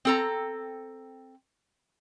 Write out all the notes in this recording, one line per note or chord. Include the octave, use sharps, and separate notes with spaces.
C4 A4 A#5